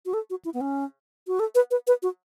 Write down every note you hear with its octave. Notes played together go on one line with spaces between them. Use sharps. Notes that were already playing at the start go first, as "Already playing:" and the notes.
F#4
A4
F#4
E4
B3
C#4
F#4
A4
B4
B4
B4
F#4